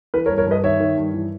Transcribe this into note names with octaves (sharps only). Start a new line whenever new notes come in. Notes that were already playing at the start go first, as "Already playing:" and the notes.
E3 B4
A#4 C#5
G2
A#4 C#5
G2 B4 D#5
D#3 C#5 E5
D#3
G2
E3